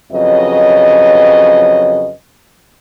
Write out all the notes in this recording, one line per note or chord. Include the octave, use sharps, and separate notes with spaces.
F2 C#3 F#3 B4 D#5